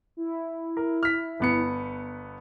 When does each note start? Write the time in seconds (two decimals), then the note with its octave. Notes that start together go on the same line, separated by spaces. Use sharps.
0.17 E4
0.77 A#4
1.03 F6 B6
1.40 G1 B3 C#7